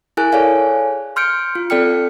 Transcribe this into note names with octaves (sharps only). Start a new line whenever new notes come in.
E4 G#4 A#4 G#5 F#6
G#4 A4 C#5 D5 F5 G#5
C6 F6 G6 C#7 D7
F4
C4 A4 D5 G5 F6 C#7